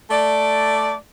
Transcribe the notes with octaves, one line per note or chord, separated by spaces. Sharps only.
A3 D5